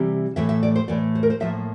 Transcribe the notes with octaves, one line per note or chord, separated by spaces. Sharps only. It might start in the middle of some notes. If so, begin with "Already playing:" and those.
Already playing: C3 E3 G3
A2 E3 A3 E5
E5
D5
C5
A2 E3 A3 D5
C5
A#4
C5
A2 F3 A#3 E5